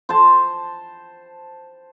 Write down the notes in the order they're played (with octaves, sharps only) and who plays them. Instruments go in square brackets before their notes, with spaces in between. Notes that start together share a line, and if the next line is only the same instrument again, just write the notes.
[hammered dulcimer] C5 A5